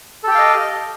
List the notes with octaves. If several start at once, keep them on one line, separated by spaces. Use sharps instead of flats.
G4 A4 D#5 F5 G5